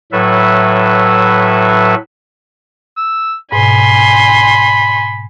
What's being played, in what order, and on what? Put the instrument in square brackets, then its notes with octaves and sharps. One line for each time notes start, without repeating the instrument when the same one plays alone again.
[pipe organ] A2 F#3 A4 B4 E5
[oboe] E6
[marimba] G#2 B2 [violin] G#5 C6 [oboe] B5